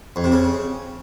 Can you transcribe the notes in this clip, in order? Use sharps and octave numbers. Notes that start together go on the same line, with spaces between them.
F2
C3
C#3